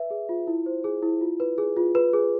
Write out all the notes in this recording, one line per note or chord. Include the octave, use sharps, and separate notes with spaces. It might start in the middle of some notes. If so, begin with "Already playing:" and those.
Already playing: B4 E5
G#4
F4
E4
C5
G#4
E4
F4
B4
G#4
F4
B4
G#4